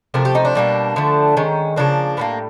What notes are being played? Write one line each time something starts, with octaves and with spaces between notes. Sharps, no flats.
C3 F3 A3 A#4
G4
D#4
D4
B2 G3 A#3
D3 F3 A3
D#3 G#3 C#4
C#3 F3 A#3 D4
A2 E3 G3 A#3 B3